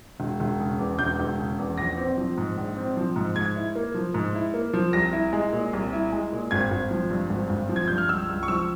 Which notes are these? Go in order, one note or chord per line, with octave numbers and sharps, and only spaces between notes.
E1
E1
C#3
E2
E1 G6
E1
C#3
E2
A#1 A#6
C4
F3
G#2
A#1
C4
F3
G#2
G#2 G#6
E4
A#3
F3
G#2
E4
A#3
F3
C2 A#6
E4
G#3
A#2
C2
E4
G#3
A#2
G#1 G#6
G#1
F3
G2
G#1
G#1
F3
G#6
G2 G6
F6
C#2 E6
C#2
C#6
F3 E6